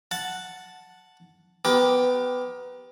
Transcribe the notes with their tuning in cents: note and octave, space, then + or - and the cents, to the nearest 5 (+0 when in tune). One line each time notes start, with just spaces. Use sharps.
F#5 +0 A5 +0
B3 +15 G4 +0 A#4 +30